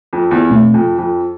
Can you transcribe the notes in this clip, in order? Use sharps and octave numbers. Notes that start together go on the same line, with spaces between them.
F2
E2
B2 A3 C4
F2
F2